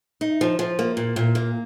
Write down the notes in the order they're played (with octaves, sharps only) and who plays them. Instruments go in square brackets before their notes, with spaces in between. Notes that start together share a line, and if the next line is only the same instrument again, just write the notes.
[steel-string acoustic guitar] D#4
F3
F3
A#3
A#2
A#2
A#3